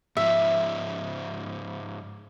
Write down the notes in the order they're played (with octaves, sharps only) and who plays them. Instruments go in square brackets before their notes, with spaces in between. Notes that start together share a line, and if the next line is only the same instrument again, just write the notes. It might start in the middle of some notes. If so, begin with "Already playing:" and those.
[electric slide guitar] G#2 F3 [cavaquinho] E5